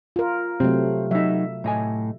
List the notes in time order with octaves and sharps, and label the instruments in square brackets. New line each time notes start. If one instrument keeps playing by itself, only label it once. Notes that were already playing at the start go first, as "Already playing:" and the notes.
[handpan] F4 A#4
[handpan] C3 F#3 A3 [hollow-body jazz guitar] C4
[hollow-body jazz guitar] F#3 D#4 [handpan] E5
[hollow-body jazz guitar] A2 D#5 G#5